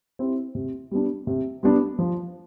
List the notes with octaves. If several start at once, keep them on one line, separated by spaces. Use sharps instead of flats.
C4 E4 G4
C3
G3 B3 D4
C3
G3 B3 D4
F3